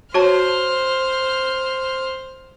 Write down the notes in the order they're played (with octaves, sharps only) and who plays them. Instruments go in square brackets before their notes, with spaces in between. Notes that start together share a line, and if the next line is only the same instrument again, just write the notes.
[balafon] F#4 C#5 A5 [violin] C5 F6